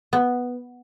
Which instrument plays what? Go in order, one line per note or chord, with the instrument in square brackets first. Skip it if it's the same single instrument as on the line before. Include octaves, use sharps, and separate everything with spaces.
[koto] B3